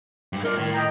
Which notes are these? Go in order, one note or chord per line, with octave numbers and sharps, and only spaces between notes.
G2 G#3
D#4 F4 A#4 D5
A2 D#3
D#5 G5 A#5